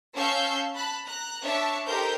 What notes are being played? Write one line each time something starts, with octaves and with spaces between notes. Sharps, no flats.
C#4 F5 A5 C#6 E6 G6
A5 B5 F#6
A#5 F#6
D4 C#5 E5 A5 C#6
D#4 G4 A4 A#4 C5 G6